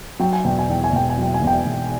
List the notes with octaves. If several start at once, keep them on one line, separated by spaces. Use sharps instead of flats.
F#3 G5
G#5
E1 G5
G#5
E2 G5
G#5
E1 G5
G#5
F#3
G5
G#5
E1
G5
E1